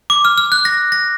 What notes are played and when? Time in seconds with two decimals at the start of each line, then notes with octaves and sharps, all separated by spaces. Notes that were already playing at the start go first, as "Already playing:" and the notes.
0.10 D6
0.25 F6
0.38 F6
0.52 F#6
0.65 A#6
0.92 A#6